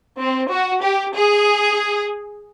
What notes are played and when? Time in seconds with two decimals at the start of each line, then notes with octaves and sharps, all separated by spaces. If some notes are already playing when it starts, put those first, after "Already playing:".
0.19 C4
0.51 F#4
0.82 G4
1.14 G#4